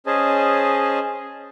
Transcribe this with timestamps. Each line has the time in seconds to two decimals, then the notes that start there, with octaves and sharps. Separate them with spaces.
0.06 C#4 G#4 C5 D#5 G#5 A5